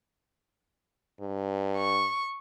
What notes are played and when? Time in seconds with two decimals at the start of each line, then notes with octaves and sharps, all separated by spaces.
1.20 G2
1.77 C#6